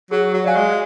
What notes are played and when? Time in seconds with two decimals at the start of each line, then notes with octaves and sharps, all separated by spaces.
0.11 F#3 G#4
0.34 F#3
0.44 F#3 D5 F5 G#5
0.56 G#3